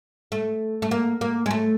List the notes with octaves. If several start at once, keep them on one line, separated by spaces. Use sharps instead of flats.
A3
A3
A#3
A#3
G#3
A3